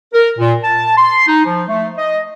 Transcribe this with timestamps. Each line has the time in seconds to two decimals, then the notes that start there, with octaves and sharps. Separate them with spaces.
0.13 A#4
0.38 A#2
0.63 A5
0.96 C6
1.27 D#4
1.45 F3
1.68 A3
1.97 D#5